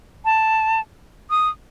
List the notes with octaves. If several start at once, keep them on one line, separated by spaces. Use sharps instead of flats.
A5
D#6